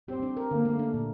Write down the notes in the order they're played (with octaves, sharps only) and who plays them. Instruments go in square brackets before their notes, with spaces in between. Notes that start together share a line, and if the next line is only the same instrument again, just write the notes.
[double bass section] C4 [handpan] G4
[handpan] D4
A#4
[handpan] D3 [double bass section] A#3
[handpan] A3
D4
A#2